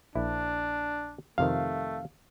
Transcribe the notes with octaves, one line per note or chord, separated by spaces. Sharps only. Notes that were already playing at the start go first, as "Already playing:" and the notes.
A#1 D4 E4
F2 C3 D#3 A3 F5